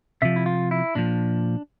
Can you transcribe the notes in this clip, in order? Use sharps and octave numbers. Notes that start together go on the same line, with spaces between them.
C3 F3 E5
E4
F4
E4
A#2 F3 D4